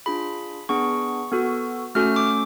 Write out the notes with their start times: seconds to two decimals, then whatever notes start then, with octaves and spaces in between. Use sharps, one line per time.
0.06 D4 F4 G#4 B5
0.69 B3 D4 G#4 C#6
1.32 B3 F#4 A4
1.95 A3 C#4 F#4 A4 F6
2.16 D6